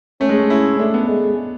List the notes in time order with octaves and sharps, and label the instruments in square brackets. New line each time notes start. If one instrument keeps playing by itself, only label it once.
[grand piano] A3 [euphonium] C#4
[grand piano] G#3
A3
E4
[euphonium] A3 [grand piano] D4
[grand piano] B3
[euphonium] G#3